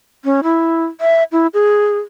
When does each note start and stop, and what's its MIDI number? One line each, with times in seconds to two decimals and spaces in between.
0.25 0.40 61
0.43 0.84 64
1.01 1.24 76
1.32 1.47 64
1.54 1.98 68